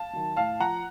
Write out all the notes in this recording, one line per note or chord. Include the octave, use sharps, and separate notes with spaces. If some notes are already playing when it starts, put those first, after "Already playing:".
Already playing: F5 A5
D#3 F#3
A2 F5 A5
F3 F#5 A#5